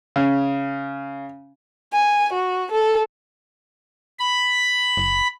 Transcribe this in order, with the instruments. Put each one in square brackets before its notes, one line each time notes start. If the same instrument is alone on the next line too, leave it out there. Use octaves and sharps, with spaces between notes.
[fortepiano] C#3
[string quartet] G#5
F#4
A4
[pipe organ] B5
[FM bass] F#1